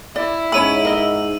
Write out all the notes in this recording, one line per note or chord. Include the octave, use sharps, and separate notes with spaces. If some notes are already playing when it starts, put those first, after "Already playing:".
E4 D5
G#2 C#4 C#5 B5 E6 D#7
A#4 D#5